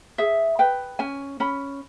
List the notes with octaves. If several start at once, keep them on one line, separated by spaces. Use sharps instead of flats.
G#4 E5
B4 G5
C#4 G#5
C#4 B5